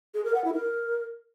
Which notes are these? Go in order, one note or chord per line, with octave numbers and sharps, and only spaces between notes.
G#4
A#4
F#5
E4
A#4